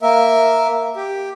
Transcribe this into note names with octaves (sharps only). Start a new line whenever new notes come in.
A#3 A#4 E5
G4